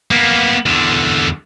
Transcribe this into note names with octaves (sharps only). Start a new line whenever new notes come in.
A#3 B3
E2 D3